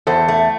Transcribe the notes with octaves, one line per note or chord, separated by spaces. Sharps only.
E2 A4 C5
A3